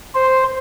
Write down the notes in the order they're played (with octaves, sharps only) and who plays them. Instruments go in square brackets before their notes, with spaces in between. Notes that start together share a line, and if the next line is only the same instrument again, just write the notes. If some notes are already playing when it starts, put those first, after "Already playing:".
[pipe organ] C5